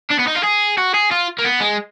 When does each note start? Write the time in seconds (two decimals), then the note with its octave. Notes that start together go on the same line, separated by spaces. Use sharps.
0.10 D4
0.19 B3
0.27 D#4
0.36 F4
0.43 G#4
0.78 F#4
0.94 G#4
1.11 F4
1.39 A#3
1.45 B3
1.61 G#3